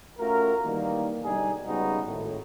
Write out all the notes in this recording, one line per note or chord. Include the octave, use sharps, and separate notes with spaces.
A3 C#4 F4 F#4 A#4
D#3 E3 G3 A#3
B1 D3 G3 D#4 G#4
C#3 G3 G#3 B3 D#4 F#4
G#1 A2